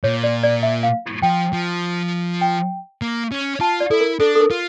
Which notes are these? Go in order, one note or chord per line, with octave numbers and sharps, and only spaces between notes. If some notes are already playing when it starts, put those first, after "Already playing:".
A#2 C#5
D5
D5
E5
F5
F3 G5
F3
G5
A#3
C#4
F4 A5
D5
E4 A4
A#4
D4 A4
A4
A#4
F4